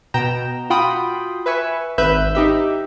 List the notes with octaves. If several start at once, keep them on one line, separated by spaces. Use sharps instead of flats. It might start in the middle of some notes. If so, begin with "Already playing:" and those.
B2 G5 A#5 E7
F4 F#4 G5 B5 C6 D#6
B4 E5 G#5 C#6
G#1 B4 E5 E6 F#6 G6
D#4 G4 E5